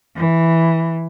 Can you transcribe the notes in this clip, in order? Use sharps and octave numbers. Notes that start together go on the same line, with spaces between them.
E3